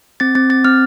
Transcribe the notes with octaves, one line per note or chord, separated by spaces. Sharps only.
C4 A6
C4 A6
C4 A6
C4 F6